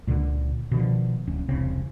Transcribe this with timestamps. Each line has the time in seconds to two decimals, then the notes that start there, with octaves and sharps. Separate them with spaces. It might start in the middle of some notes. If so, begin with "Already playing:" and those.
0.07 C#2 A#2 D3
0.71 B2 D3 D#3 F3
1.27 D1 C#4
1.49 E1 C2 C#3 C4